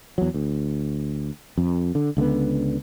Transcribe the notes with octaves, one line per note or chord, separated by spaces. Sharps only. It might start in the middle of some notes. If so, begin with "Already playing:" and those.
E2 F#3
D2
F2
D3
C#2 D3 G#3 B3